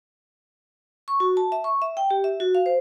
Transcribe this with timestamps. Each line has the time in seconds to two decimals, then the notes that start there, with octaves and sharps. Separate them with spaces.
1.08 C#6
1.20 F#4
1.37 A5
1.52 E5
1.64 C#6
1.82 E5
1.97 G5
2.10 G4
2.24 E5
2.40 F#4
2.55 F5
2.66 C5